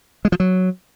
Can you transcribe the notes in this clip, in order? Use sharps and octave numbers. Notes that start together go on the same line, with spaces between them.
G#3
F3
F#3